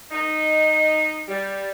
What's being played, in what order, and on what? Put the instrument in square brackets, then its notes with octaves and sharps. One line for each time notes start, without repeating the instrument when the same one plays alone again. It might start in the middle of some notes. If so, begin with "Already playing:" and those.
[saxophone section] D#4
G3